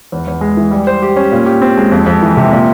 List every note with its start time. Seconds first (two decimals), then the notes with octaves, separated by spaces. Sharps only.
0.12 E2
0.27 E2
0.41 G#3
0.57 E3
0.71 G3
0.87 C5
1.02 G4
1.16 C#4
1.32 A#2
1.46 G4
1.62 C4
1.77 G#3
1.92 F2
2.06 F2
2.22 E3
2.37 C3
2.52 A#2